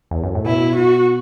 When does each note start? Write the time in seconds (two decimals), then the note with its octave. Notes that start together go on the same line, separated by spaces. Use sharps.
0.11 E2
0.23 F#2
0.35 A2
0.46 B2 E4
0.75 F#4